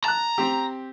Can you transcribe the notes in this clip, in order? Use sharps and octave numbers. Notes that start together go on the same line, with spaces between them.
A5 A#5 F#6
C4 G4